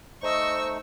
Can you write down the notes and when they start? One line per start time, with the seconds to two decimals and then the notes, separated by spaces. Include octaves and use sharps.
0.23 A3 D#4 C5 D#5 C#6 E6